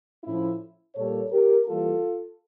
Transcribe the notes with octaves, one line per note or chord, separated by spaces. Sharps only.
A2 F3 A3 C#4 E4
A#2 G3 A#3 A4 C#5
G4 A#4
E3 G3 A#3 F4 A4